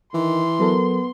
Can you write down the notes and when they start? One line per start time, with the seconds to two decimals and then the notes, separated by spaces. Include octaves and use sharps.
0.14 D#3 E3 C6
0.60 F#3 B3 A4 A#4